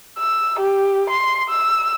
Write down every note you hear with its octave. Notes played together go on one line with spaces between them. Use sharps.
E6
G4
C6
E6